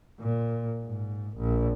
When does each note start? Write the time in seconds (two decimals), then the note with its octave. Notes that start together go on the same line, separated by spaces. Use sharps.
0.20 A#2
0.84 G#2
1.37 A#1